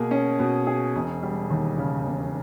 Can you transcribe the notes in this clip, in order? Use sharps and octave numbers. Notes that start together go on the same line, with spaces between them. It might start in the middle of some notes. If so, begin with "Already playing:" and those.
Already playing: B2 A#3 G#4
C#4
B2
G#4
E1
G3
D#2
C#3
E1